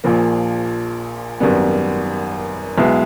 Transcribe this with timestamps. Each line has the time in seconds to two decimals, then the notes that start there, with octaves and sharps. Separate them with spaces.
0.04 A#1 A#2 F3 A#3
1.40 G#1 F#2 D#3 G3 B3
2.78 B1 B2 G#3 B3 E4